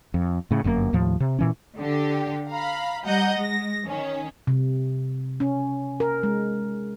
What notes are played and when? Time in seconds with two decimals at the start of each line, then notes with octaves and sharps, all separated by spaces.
0.14 F2
0.51 A2 C#3
0.64 G1 F#2 A2 A#3
0.93 D#2 A2 F3
1.20 C3
1.39 A#2 E3 C#4
1.78 D3 G4
2.50 F5 A#5 B5
3.05 G3 D#5 F#5 A#5 G6
3.38 G#3 A#6
3.86 D#3 C#4
4.47 C3
5.40 C#4
6.00 A#4
6.23 G#3